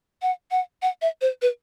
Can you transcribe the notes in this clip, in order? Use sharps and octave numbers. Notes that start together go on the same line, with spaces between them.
F#5
F#5
F#5
E5
C5
B4